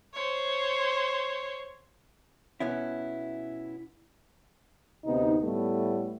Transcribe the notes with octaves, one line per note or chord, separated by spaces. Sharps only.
C5 C#5
B2 B3 C#4 E4
D2 C3 B3 D#4
A2 G3 A3 B3